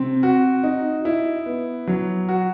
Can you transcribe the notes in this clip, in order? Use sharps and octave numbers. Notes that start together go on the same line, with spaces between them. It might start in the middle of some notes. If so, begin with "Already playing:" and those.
Already playing: C3 C4
F#4
D#4
E4
B3
F#3
F#4